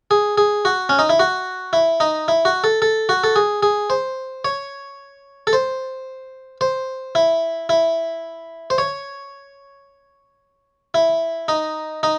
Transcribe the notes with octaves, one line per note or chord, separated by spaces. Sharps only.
G#4
G#4
F#4
C#4
D#4
E4
F#4
E4
D#4
E4
F#4
A4
A4
F#4
A4
G#4
G#4
C5
C#5
A4
C5
C5
E4
E4
C5
C#5
E4
D#4
D#4